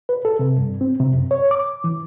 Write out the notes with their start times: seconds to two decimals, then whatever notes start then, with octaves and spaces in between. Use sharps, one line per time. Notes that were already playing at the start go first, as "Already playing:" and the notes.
0.09 B4
0.25 A4
0.39 C3
0.58 G2
0.81 C4
1.00 C3
1.13 F#2
1.31 C#5
1.51 D6
1.84 E3